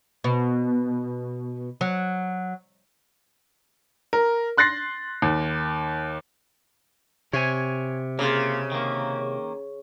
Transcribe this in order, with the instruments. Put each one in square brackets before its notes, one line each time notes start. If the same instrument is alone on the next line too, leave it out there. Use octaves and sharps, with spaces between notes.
[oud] B2
F#3
[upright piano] A#4
C6 F#6 A6 A#6 C7
D#2
[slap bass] C3 [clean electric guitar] C#5 G#5
[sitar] C#3 [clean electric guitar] A#3 F4
[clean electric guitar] D#3 A#3